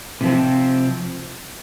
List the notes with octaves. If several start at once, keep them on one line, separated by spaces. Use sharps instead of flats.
C3 F3 C4